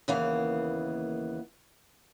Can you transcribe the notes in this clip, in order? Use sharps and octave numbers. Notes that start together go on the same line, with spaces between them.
D#2 C#3 E3 A#3 B3 F5